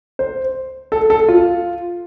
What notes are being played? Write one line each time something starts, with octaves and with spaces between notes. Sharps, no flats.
C5
A4
A4
F4